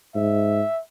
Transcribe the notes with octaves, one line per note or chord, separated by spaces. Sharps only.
G#2 E5